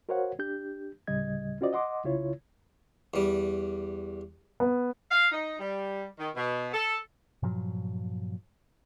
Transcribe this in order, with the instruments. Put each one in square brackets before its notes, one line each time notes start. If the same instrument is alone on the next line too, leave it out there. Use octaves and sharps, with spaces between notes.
[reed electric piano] F#4 A#4 C5 C#5 F5 F#5
D4 G4 G6
D2 A2 C#3 G3 D#5 G#6
C#4 F4 F#4 C5 D5 D#5
D#5 F#5 C6 D6
C2 C#3 E4 F4 C#5
[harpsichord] E2 G3
[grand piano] B3
[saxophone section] F5
D#4
G3
D#3
B2
A4
[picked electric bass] G2 A#2 F3 F#3